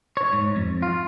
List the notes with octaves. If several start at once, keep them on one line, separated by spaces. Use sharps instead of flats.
C#5
G#2
F2
F4